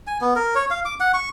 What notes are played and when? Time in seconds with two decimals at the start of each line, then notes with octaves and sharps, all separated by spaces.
0.07 G#5
0.21 B3
0.36 A#4
0.55 C#5
0.70 F5
0.85 D6
1.00 F#5
1.14 C#6